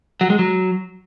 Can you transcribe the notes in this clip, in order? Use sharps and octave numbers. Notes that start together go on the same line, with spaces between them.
F#3
G#3
F#3